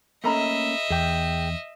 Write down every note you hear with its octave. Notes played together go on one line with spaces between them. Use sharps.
A3 A#3 C#4 A4 D#5 E5 A#5 B5
E2 G#4 G5